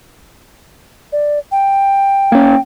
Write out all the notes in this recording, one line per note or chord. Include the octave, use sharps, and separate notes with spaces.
D5
G5
A#3 C#4